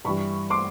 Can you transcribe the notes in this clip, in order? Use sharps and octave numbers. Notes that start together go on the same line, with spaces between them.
G2 E3 G3 B5 C#6
C6 D6